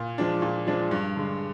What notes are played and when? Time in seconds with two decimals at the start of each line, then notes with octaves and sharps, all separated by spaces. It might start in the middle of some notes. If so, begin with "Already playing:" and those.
Already playing: A#2
0.18 F3 G#3 D4
0.42 A#2
0.67 F3 G#3 D4
0.91 G2
1.16 D3 G#3